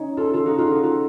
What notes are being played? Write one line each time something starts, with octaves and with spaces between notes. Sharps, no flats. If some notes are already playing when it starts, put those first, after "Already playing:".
Already playing: C#4 D#4
F4 A4
F4 A4
D#4 F#4
F4 A4
D#4 F#4
F4 A4